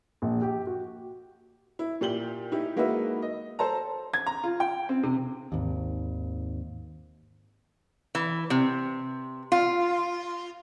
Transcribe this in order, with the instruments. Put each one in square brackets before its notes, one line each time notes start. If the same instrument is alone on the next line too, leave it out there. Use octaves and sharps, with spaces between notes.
[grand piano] A#1
G4
F#4
[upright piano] E4
A#2 G4 F#7 G7
D#4 E4 G4
G#3 A#3 D#4 F#4 B4 E5
D#5
A4 C5 A5 A#5
[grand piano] G#6
A#5
F4
G5
C4
C3
[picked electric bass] G#1 D#2
[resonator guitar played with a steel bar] E3
C3
F4